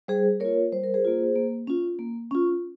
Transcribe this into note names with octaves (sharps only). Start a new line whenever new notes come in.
G3 G#4 C5
A#3 F4 A#4 C#5
G3 C5
A#4
G#4 C5
A#3 F4
A#3
C#4 F4
A#3
C#4 F4